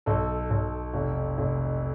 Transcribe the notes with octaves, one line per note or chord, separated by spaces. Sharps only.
B1 A4
B1
F1
F1